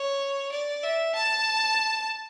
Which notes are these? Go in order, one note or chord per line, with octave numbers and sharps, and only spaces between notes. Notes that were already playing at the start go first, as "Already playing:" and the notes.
Already playing: C#5
D5
E5
A5